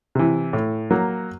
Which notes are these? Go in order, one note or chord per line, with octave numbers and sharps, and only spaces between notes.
C3 E3
A2
F#3 A#3